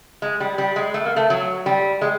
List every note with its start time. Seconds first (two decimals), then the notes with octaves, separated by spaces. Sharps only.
0.22 G#3
0.40 G3
0.58 G3
0.76 G#3
0.94 A3
1.05 A#3
1.16 A3
1.30 F#3
1.66 G3
2.01 G#3